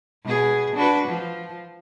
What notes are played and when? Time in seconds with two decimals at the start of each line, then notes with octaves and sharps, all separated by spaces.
0.24 B2 G#4
0.75 D4 F#4 B4
1.07 F3